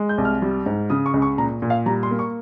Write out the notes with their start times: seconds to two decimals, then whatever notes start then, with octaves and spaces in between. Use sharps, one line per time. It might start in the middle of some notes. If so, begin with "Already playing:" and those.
Already playing: G#3
0.09 G6
0.18 C2
0.25 F6
0.42 G3
0.66 G#2
0.90 C#3 D#6
1.06 C#6
1.14 C#2
1.22 C#6
1.38 A#2 A#5
1.62 A#2
1.70 F5
1.86 G3 A#5
2.03 C6
2.11 A#3
2.19 C#6